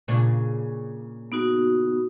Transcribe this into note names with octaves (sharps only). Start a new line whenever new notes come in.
A#2 C#3 D4
B3 D#4 F#4